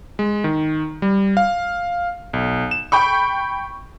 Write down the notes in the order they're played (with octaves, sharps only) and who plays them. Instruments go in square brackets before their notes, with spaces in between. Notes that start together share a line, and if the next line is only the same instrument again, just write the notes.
[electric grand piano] G#3
D#3
G3
F5
B1
E7
[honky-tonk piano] G5 B5 C#6